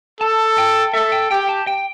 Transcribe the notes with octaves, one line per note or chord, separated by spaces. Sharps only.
A4 A5
G5
A4 E5
G5
G4 G5
A5
G5